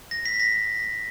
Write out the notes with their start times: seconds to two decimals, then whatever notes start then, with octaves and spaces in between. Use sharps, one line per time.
0.11 A#6
0.26 B6
0.40 A#6